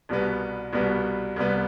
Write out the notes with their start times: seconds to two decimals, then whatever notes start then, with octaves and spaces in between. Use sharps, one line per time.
0.09 C2 B2 G3 B3
0.73 C2 B2 G3 B3
1.36 C2 C3 G3 B3